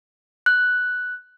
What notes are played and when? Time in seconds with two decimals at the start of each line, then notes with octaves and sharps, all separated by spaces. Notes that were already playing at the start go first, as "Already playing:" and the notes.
0.46 F#6